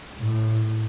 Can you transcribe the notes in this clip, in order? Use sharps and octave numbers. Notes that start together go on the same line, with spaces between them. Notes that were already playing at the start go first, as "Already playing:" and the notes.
A2